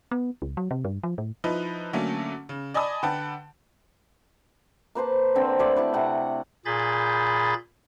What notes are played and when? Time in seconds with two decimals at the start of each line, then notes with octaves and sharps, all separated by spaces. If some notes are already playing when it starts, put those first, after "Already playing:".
0.11 B3
0.42 C#2
0.57 F#3
0.71 C3
0.85 G2
1.03 F3
1.18 A2
1.44 F3 D#4 E4 B4
1.93 D3 F#3 A3 A#3 C#4
2.49 C#3
2.74 D5 D#5 G#5 A5 B5 D#6
3.03 D3 B4 F#5 G5 A5
4.95 A#3 B4 C5 A5
5.35 D3 C4
5.59 A3 A4 B4 D5
5.76 E4 G4 B4
5.93 C3 F#5 G5
6.65 A#2 G#4 B5 G6 A6